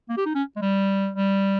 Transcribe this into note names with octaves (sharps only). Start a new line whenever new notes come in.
A#3
G4
D#4
C#4
G#3
G3
G3